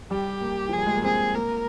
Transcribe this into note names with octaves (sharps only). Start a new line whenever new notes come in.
G3 G4
A#3
F3
G3 G#4
G#3
A#3
C4 G#4
A#3 A#4